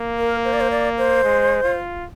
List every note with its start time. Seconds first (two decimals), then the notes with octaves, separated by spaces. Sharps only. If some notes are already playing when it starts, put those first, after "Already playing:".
Already playing: A#3
0.18 A#4
0.45 C5
0.53 D5
0.61 C5
0.71 D5
0.98 C5
1.24 G#3
1.64 F4